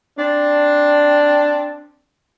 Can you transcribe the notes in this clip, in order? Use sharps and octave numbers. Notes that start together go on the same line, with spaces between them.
C4 D4